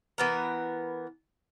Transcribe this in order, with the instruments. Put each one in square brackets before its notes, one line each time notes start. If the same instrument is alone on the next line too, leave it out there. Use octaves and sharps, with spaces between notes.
[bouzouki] E3 B3 A#4